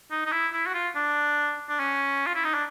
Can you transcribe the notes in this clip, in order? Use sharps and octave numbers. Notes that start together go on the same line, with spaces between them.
D#4
D#4
E4
E4
F#4
F4
D4
D4
C#4
F4
E4
D#4
D4